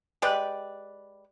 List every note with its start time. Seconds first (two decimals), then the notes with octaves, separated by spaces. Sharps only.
0.22 G#3 G4 B4 D5